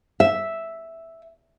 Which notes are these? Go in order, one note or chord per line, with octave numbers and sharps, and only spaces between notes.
E5